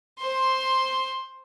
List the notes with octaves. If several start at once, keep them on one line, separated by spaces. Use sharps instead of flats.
C5 C6